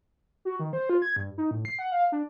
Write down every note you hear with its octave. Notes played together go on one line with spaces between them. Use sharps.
F#4
D#3
C5
F4
G#6
G2
D#4
A2
C7
F#5
F5
D4